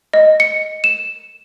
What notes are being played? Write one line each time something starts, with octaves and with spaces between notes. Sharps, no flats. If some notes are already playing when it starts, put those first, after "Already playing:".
D#5
C#7
E7